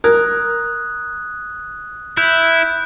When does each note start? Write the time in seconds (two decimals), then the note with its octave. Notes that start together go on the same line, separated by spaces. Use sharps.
0.04 A#4 D#6 F#6 G#6
2.17 E4 B5 F#6 G6